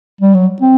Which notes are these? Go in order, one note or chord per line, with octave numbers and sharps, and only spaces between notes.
G3
F#3
C4